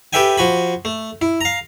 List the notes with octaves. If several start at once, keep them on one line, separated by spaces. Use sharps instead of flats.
G4 A4 B4 E5 G5 G#5
F3 F#4 G#5 B5
A3
E4
F5 A#5